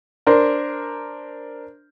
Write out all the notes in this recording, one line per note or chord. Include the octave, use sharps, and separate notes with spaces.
D4 A#4 C5